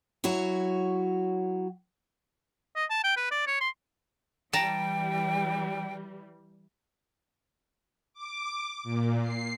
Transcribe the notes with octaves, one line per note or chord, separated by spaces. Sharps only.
F#3 E4 F#4 C#5
D#5
A5
G5
B4
D5
C#5
C6
E3 G3 G5 A5 A#5
D6
A#2
C7